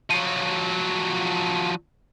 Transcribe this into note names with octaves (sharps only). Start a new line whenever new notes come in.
F3 F#3